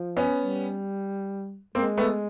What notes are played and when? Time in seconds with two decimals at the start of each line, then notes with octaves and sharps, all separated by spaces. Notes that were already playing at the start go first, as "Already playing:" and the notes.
Already playing: F3
0.17 B3 C#4
0.39 G3
1.75 G#3 A#3 C4
1.98 A3 B3